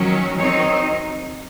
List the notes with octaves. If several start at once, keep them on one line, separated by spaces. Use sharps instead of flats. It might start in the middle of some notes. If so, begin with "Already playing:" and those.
Already playing: D#3 F#3 C#4
D#3 F#3 C4 D#4 C#5